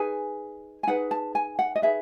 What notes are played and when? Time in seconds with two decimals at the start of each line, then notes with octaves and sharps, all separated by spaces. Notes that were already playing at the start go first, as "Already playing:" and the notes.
Already playing: D#4 G#4 B4 G#5
0.83 G#5
0.87 D#4 G#4 B4 F#5
1.11 A5
1.35 G#5
1.59 F#5
1.76 D#5
1.82 D#4 G#4 B4 E5